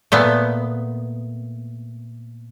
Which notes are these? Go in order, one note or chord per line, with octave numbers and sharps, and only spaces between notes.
A#2 A3 B3